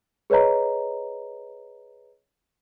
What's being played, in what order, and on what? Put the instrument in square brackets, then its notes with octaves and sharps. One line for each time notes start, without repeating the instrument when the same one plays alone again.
[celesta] G#4 B4 C#5 D#5 A#5